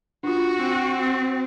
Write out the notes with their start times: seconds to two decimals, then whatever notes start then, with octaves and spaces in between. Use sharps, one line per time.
0.23 D4 F4 F#4
0.58 C4